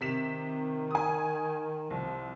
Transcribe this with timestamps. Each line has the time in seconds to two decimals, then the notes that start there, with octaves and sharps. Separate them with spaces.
0.01 C3 D#3 B6 E7
0.91 G#5 D#6
1.90 C2 F3